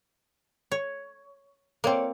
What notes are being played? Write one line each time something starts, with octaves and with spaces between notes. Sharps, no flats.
C#5
A#3 C4 F4 C#5 D5